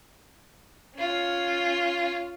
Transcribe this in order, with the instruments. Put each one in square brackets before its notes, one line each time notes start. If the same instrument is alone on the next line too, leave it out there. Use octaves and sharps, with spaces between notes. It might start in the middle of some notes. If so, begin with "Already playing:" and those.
[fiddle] C#4 F4